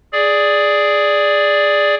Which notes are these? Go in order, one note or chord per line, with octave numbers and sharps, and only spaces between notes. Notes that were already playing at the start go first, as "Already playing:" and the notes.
G#4 D5